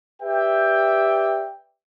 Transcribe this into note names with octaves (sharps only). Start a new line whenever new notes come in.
G4 B4 D5 E5 G5